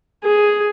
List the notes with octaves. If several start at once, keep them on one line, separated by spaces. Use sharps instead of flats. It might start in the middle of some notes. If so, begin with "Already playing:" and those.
G#4